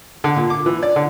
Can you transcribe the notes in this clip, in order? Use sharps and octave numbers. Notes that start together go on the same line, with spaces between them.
D3
A#2
D6
E3
D5
D3